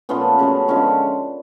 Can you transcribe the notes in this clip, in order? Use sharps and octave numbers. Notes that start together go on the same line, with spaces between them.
A#2 F3 A3 B3 C#4
C#3 F#3 A3
D3 F3 G#3 B3 C#4